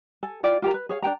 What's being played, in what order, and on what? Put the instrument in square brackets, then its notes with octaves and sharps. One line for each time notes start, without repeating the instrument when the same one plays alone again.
[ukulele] A4 G#5
E4 F4 D5 G5
F4 G4 A#4 A#5
B4
G#4 C#5 F5
D4 C5 G5 A#5